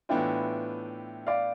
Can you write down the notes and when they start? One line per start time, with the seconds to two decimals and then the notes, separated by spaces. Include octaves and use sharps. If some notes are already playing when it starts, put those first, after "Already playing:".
0.09 A2 E3 B3 D4 F4 E5 G5
1.27 D5 F5